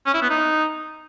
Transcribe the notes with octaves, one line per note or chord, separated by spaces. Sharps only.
C#4
E4
B3
D#4